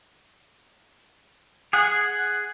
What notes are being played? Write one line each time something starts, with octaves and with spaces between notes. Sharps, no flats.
G#4 F#5